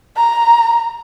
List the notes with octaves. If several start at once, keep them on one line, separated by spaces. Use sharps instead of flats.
A#5